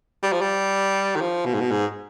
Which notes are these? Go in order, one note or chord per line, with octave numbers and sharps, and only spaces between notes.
G3
F3
G3
D#3
F3
B2
G#2
B2
G#2